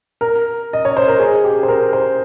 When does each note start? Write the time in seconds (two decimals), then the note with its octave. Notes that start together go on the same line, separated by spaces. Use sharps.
0.21 A#4
0.73 D#5
0.85 C#5
0.97 C5
1.08 A#4
1.19 G#4
1.44 G4
1.63 C5
1.68 A#4
1.93 C5